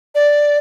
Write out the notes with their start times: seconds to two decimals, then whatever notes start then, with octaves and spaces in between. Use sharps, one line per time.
0.15 D5